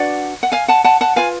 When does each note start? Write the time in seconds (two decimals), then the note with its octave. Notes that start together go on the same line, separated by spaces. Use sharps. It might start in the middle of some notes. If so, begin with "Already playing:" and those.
Already playing: D4 F#4 B4 D5 F#5
0.43 F#5
0.52 F5 G#5
0.68 F#5 A5
0.84 F#5 A5
1.01 F#5 A5
1.16 F4 B4 F5 G#5